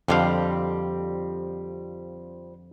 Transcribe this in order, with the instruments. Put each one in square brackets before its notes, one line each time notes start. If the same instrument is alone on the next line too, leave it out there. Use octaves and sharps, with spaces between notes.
[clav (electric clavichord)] F2 D3 F5 [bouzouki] F3 G3 C4